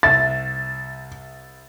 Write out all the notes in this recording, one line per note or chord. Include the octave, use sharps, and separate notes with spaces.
C2 E5 A6